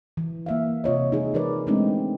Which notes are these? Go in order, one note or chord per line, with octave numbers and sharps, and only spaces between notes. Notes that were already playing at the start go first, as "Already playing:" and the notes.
E3
A#3 E5 F5
C3 F4 C#5 D#5
D#4 G#4
E3 D#4 G#4 A#4 B4 D5
G#3 A3 B3 C4 D4 D#4